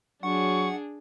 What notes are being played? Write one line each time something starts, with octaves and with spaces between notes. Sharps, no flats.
F#3 D4 G#4 F#5 C#6